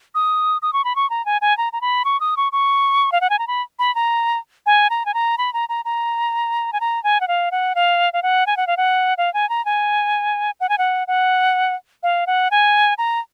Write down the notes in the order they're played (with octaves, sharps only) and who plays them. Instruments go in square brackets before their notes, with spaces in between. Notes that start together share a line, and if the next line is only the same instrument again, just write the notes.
[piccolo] D#6
D#6
C#6
B5
C#6
A#5
G#5
G#5
A#5
A#5
B5
C#6
D#6
C#6
C#6
F5
F#5
G#5
A#5
B5
B5
A#5
G#5
A#5
G#5
A#5
B5
A#5
A#5
A#5
G#5
A#5
G#5
F#5
F5
F#5
F5
F5
F#5
G#5
F#5
F5
F#5
F5
G#5
A#5
G#5
F#5
G#5
F#5
F#5
F5
F#5
G#5
A#5